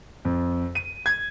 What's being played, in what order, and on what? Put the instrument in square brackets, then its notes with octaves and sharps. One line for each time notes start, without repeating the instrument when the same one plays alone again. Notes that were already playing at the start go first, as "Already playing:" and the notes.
[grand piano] F2
D#7
G#6